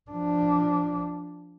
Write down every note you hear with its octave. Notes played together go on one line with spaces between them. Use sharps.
F3 D4